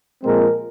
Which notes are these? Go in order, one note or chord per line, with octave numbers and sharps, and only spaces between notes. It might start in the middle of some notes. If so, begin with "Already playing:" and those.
A#2 F3 G#3 C4 A#4